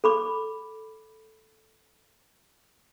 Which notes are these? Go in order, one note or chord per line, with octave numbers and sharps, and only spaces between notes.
A4 B5 D6